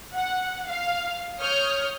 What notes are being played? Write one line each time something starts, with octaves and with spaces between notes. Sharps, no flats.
F#5
F5
C#5 D#6 F6 G6